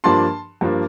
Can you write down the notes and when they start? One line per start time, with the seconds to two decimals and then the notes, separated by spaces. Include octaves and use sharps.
0.04 G2 F3 A#3 D4 A5 C6
0.61 G2 F3 A#3 D4